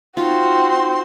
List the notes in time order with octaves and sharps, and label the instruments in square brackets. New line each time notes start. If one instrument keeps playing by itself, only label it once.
[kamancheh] C4 F#4 [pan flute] D#4 [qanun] F4 [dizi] C6